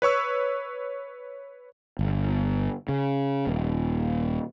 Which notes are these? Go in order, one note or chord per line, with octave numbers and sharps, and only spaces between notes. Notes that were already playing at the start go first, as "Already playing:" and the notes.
B4 C#5 C#6 E6
G1
C#3
D#1